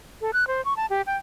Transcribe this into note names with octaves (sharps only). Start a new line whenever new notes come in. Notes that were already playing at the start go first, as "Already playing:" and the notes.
A4
F#6
C5
C#6
A5
G4
G5